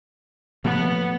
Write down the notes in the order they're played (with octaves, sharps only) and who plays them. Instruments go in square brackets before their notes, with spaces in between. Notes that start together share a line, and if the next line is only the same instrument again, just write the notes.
[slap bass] A2 F3 A#3 [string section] B3